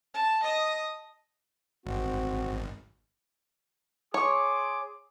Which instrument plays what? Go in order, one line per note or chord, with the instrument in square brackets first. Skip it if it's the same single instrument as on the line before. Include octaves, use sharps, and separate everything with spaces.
[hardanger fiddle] A5
D#5 D#6
[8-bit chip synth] G#1 [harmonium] C4 F#4
[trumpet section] G#4 C6 D6 [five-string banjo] C#5